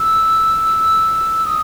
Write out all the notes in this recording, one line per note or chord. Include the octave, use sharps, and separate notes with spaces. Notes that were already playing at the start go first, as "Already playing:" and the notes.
Already playing: E6
D#6